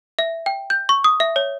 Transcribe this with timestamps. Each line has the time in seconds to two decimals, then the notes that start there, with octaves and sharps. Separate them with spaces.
0.19 E5
0.46 G5
0.70 G6
0.89 C#6
1.04 D#6
1.20 E5
1.36 C#5